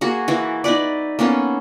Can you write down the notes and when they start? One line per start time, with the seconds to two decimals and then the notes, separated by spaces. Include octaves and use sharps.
0.01 A#3 F#4 G#4
0.28 E3 A#3 E4
0.64 D#4 E4 B4 D5
1.19 A#3 B3 C#4 A4